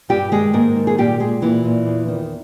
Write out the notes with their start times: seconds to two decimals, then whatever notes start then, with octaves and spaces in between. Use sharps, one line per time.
0.09 G2 G3 G4
0.32 D#3 G#3 G#4
0.53 G#2 A#3 A#4
0.76 D#3
0.87 G#4
0.98 A#2 G3 G4
1.20 A#2 G#3 G#4
1.42 A#2 E3 E4
1.64 A#2
1.86 E2
2.08 D#3